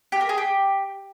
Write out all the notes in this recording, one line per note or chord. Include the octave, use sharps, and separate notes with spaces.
G4
A#4
G#4
G4